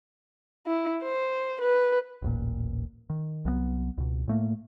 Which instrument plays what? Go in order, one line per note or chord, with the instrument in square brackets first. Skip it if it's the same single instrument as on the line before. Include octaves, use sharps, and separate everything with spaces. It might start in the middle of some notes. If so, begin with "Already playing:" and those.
[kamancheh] E4
C5
B4
[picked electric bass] D#1 A1 A#2
D#3
C2 F#3 G#3 B3
C#2 B2
A2 A3 A#3